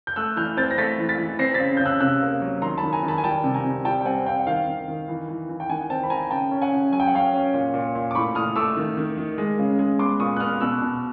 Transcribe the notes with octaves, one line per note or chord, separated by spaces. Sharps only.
G6
A3 E6 F#6
E3 F6 G6
C4 G6 A6
A#6
A3 A6 B6
E3
A6 B6
E3
C4 A#6 C7
A6 B6
C#3
C#3 G6
E6 F#6
C3 E6 F#6
A#3
F#3
D#3 A#5 C6
A5 B5
D#3
G#5 A#5
D#3
A5 B5
G#5
G3 G5 A5
C3
G#5 A#5
C3
G3 G5 A5
G5
C4 F#5 G#5
C4 F5 G5
F#5
D#3 F5 G5
D#3
D#3
E3
E3
E3
G5
D#3 F#5 G#5
C4 G5 A5
B5
D#3 G#5 A#5
C#3 G5 A5
C#4
F#5 G#5
C#3
F#3 G#5
G5
F#5
C#4 F5 G5
C#4
A#2
A#2
A#2
D6
A2 B5 C#6
A2 D#6 F6
A3 D6 E6
D#3
D#3
D#3
G#3
C#3
G#3
B3 C6 D6
A#2 C#6 D#6
F#6
B3 D#6 F6
B2 E6 F#6
B2